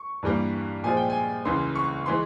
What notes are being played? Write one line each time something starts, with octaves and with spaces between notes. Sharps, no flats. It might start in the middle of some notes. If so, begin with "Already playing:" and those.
Already playing: C#6
G2 E3 G3 A#3
A#2 F3 G#3 G#5
G5
G#5
C#2 C#3 E3 C6
C#6
E3 G#3 C6